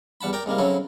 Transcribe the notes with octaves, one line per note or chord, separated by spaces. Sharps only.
E2 G3 F#5 A5 B5
A#4 D5 G5 A#5
G#2 C3 G3 A#3
C#3 F#3 C4 E4 A4